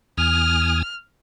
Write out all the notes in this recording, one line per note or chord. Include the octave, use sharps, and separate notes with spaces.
E2 G#5 D#6 F6